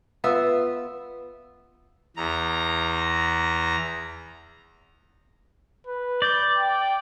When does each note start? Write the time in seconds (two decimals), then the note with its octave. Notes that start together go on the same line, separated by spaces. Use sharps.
0.24 B3 F4 E5
2.16 E2 A#5
5.87 B4
6.22 D5 G6
6.58 G5